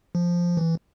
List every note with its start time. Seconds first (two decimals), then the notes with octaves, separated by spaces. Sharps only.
0.15 F3
0.57 E3